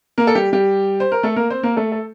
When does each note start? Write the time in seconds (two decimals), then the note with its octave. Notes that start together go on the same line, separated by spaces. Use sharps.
0.18 A#3 A#4
0.27 A4
0.35 G3 G4
0.53 G3 G4
1.00 C5
1.12 A#4
1.23 A3 A4
1.36 A#3 A#4
1.50 C4 C5
1.63 A#3 A#4
1.77 A3 A4
1.92 A4